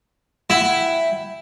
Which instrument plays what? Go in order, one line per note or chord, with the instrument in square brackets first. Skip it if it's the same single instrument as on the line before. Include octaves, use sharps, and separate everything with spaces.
[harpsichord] E4 [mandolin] E5 F#5 G5